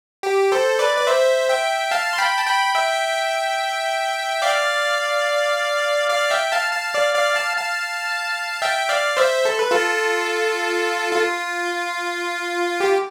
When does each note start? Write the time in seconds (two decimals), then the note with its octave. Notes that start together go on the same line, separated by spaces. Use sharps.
0.23 G4
0.52 A4 C5
0.79 B4 D5
0.97 D5
1.07 C5 E5
1.49 E5 G5
1.91 F5 A5
2.13 C6
2.18 G5 B5
2.38 A5
2.46 G5 B5
2.75 E5 G5
4.42 D5 F5
6.10 D5 F5
6.30 E5 G5
6.52 F5 A5
6.72 F5 A5
6.94 D5 F5
7.14 D5 F5
7.36 F5 A5
7.56 F5 A5
8.62 E5 G5
8.89 D5 F5
9.17 C5 E5
9.45 A4
9.59 B4
9.71 F4 A4
11.12 F4
12.80 G4